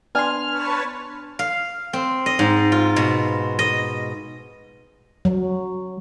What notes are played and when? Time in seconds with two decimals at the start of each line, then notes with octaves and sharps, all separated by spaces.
0.15 B3 D4 G#5 C6 F6
0.50 B4 C#5 A5
1.39 F5
1.93 C4
2.26 D#5
2.39 G#2
2.72 F4
2.96 B2
3.59 D#5
5.25 F#3